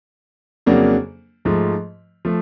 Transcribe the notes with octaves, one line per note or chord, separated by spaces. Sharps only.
F2 C#3 F#3 A#3 D4
G#2 F3 A3
F3 A3